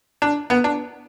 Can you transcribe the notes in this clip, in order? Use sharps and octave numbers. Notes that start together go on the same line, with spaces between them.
D4
B3
D4